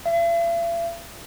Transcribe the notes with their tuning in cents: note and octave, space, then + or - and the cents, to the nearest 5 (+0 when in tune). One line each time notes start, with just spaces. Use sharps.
E5 +45